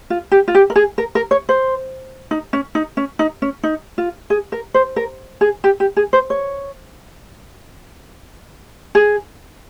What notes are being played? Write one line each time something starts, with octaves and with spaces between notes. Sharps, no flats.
F4
G4
F4
G4
A#4
G#4
A#4
A#4
C#5
C5
D#4
C#4
D#4
C#4
D#4
C#4
D#4
F4
G#4
A#4
C5
A#4
G#4
G4
G4
G#4
C5
C#5
G#4